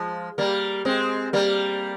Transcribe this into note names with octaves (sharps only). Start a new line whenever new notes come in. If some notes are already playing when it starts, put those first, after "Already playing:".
Already playing: F3 G#3
G3 A#3
G#3 C4
G3 A#3